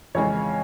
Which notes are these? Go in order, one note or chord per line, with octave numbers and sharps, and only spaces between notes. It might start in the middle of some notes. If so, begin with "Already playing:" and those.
F2 C#3 E3 G#3 C#5